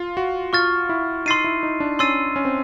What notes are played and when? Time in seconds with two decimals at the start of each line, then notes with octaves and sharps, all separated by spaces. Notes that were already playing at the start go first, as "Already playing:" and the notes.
Already playing: F4
0.17 F#4
0.53 F4 C#6 F6 A6
0.89 E4
1.26 D#4 C6 E6 A6 C7 D#7
1.44 E4
1.63 D#4
1.80 D4
1.99 C#4 C6 E6 A6 C7 D#7
2.36 C#4
2.45 C4